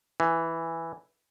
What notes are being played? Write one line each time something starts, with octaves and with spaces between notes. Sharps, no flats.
E3